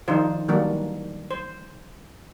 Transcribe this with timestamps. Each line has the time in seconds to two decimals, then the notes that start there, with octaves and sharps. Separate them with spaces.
0.08 D#3 F3 D4 D#4 F4 C5
0.48 D#3 E3 F#3 G3 A#3 D4
1.31 C5